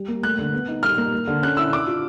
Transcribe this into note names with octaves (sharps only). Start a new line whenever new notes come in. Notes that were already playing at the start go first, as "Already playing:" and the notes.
Already playing: G3
A#3
A3 F#6
D3
B3
D#4
G3 F6
A#3
A#3
D3
C#4 F#6
E4 E6
D4 D6
F4